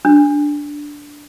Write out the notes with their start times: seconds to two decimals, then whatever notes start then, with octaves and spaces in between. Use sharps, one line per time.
0.05 D4